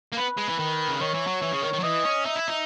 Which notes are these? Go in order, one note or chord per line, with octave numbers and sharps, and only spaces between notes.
A#3
B3 B4
G#3
E3
D#3
C#3
D#3 C#5
E3
F#3
E3
C#3
D#3
D#3
F#3
E3 D#5
C#4
D#4 E5
E4
D#4